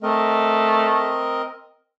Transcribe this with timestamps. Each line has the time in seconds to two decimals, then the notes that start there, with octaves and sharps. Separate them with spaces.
0.03 A3 C4 A#4 D#5